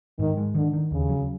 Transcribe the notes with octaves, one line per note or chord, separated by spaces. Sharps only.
G#2 D#3
G#3
D3 D#3
D#3
D#2 C#3
F#3